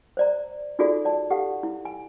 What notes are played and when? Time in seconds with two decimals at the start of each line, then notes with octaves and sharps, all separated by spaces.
0.17 C5 D5 A#5
0.79 D#4 F4 F#4 G#4 A4 D5
1.05 D5 A5
1.30 G4 A4 F5 F#5
1.63 E4
1.85 G#5